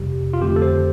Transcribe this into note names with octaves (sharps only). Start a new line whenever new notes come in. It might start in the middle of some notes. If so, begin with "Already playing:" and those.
Already playing: F2 C3 G3 G4
F4
F2 D3 A3 G4
A4
C5